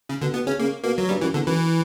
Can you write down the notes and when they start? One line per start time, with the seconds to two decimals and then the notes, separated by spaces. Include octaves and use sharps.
0.09 C#3
0.21 B2 D3
0.34 B2 B3
0.46 C#3 C#4
0.59 C#3 A#3
0.84 B2 A#3
0.98 F#3
1.09 G2 G3
1.21 F#2 E3
1.34 E2 D3
1.46 F#2 E3